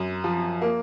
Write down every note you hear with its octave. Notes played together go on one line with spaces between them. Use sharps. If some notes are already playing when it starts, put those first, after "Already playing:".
Already playing: F#2
F3
A#3